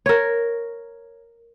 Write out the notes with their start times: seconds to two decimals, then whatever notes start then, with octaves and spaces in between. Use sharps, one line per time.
0.06 A#4 C#5